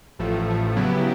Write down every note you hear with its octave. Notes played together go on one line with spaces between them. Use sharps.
A1 A2 F3 A3
A1 A2 F3 A3
C#3 F#3 B3 E4 G4